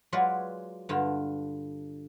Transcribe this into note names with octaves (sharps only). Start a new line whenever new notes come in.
F#3 G#3 F4 B4 D5
G2 D3 F4